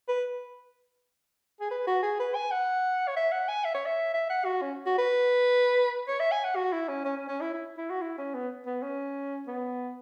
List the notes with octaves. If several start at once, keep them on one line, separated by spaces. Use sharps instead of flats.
B4
G#4
B4
F#4
G#4
B4
G#5
F#5
C#5
E5
F#5
G#5
E5
C#5
E5
E5
F#5
F#4
C#4
F#4
B4
C#5
E5
G#5
F#5
F#4
E4
C#4
C#4
C#4
C#4
E4
E4
E4
F#4
E4
C#4
B3
B3
C#4
B3